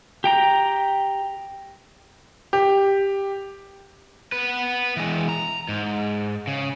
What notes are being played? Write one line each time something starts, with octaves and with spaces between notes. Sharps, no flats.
G4 G5 A#5
G4
B3 B4
E3 G#3
A#5
G#2
C#3